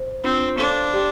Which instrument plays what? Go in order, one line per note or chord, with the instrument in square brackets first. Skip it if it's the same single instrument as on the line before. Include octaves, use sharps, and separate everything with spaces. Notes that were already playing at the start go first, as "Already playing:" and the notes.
Already playing: [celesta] C5
[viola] C4 [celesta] D4 F4 C5
[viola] D4 [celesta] A4 C5 F5 C6
[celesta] G4 D5 G5 C6